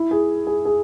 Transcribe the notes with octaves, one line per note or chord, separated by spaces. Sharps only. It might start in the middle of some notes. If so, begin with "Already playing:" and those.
Already playing: E4
G#4
G#4
G#4